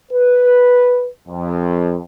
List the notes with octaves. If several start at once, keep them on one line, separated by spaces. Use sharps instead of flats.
B4
F2